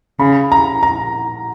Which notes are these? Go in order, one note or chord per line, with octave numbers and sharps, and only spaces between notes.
C#3 B5
A#5
A#5